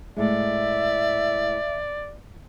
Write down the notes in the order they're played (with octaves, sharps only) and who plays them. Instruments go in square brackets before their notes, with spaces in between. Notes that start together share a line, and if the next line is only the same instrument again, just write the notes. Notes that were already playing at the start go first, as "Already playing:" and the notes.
[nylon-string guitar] A2 G#3 [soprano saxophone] D5 [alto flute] E5